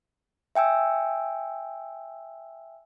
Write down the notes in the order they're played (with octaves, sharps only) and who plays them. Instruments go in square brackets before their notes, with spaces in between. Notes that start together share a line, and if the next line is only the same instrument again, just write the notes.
[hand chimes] E5 G5 G#5 E6